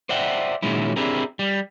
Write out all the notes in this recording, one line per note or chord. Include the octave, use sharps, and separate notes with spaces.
C5 D5 E5 F#5 G5
A#2 D#3 F#3 G#3 C#4 E4
C4 D4 E4 G4 G#4 A#4
G3